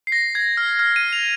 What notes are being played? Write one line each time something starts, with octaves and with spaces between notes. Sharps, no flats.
C7
A#6
G#6
F6
F6
D#7
F7